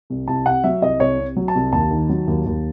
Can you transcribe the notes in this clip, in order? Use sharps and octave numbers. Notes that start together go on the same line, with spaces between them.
C2
C2 A5
C3 F#5
F#3 E5
C2 D#5
C2 C#5
C3
F#3
A5
C2
D#2 A5
D#3
F#3
D#2
D#2